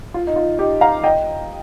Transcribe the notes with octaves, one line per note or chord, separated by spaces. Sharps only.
F4
D#4
F4
D#4 G4
F5 A#5
D#5 G5